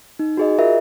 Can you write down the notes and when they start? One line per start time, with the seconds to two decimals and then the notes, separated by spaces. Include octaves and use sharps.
0.19 D#4
0.37 F#4 G#4 D#5
0.58 F4 A#4 E5